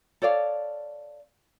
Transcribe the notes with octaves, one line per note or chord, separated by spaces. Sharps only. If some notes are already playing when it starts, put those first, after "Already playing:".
A4 C#5 D5 F5